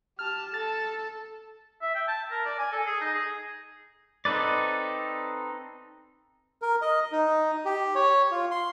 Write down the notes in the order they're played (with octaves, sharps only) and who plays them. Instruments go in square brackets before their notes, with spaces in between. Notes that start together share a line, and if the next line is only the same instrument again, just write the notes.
[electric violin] G4 A5 [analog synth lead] F6
[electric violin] A4 A5 [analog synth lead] A6
[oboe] E5
G5
A5
A#4
D5
G#5
A4
G#4
D#4
G#4
[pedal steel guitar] C4 D#4 A4 B4 D5
[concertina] A#4
D#5
D#4
G4
C#5
F4
C6